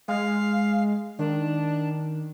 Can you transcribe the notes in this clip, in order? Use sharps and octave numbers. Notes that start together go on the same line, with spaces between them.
G#3 F5
D#3 D4